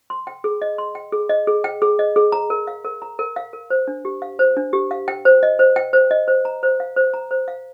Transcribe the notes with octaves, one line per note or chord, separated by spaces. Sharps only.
C6
G5
G#4
D#5
C6
G5
G#4
D#5
G#4
G5
G#4
D#5
G#4
A#5
A#4
F5
A#4
A#5
A#4
F5
A#4
C5
D4
G4
F5
C5
D4
G4
F5
G5
C5
D#5
C5
G5
C5
D#5
C5
A#5
C5
F5
C5
A#5
C5
F5